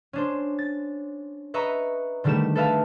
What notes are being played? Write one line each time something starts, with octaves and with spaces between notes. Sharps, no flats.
C#4 D4 C5
A6
B4 D#5 E5 A#5 B5 C#6
D3 D#3 G3 A3 G4 E7
A4 B4 E5 F5 A5